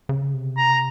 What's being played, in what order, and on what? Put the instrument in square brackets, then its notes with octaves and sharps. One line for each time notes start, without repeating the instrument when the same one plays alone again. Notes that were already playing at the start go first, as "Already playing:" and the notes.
[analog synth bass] C#3
C3
[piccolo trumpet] A#5